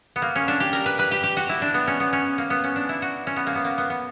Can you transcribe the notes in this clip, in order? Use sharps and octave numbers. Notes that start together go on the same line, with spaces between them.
B3
A#3
C#4
D4
G4
A#4
B4
B4
G4
G4
F#4
E4
D4
B3
C#4
B3
C#4
A#3
B3
C#4
D4
E4
F#4
C#4
B3
A#3
B3
A#3
B3
B3